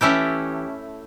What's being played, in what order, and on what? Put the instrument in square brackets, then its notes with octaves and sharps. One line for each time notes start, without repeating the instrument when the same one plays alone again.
[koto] E3 A3 C#4 E4 G4